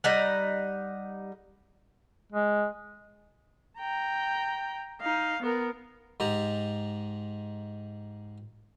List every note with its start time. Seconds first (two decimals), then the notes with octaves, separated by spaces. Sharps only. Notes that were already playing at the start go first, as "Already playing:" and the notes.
0.04 G3 D#4 F#5
2.32 G#3
3.79 G5 A#5
5.01 D#4 F5
5.43 B3 A#4
6.20 G#2 G#3 G4 A#5